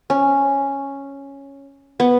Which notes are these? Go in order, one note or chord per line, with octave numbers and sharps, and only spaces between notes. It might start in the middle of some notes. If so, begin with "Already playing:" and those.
C#4
B3